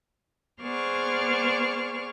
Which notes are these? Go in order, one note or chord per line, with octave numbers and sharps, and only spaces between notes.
B3 G#4 C5 D5 C#6 F6